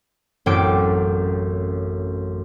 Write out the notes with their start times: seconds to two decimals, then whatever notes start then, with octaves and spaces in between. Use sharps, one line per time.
0.46 A1 F#2 C4 G5 D6 D7